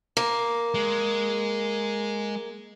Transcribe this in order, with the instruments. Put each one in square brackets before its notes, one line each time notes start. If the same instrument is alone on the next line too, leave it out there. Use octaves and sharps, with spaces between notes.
[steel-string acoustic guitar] A#3
[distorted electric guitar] G#3